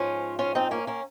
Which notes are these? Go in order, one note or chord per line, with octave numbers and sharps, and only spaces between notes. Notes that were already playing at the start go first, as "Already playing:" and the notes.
Already playing: G#2 F3 C#4 F4
C#4 F4
C4 D#4
A#3 C#4
A#3 C#4